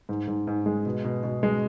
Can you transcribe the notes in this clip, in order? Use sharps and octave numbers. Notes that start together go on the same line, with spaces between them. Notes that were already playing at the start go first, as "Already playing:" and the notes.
G#2
G#2
G#2
G#3
B2
B2
B2
G#3